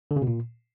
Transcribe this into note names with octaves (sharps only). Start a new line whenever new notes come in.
D3
C#3
B2
A#2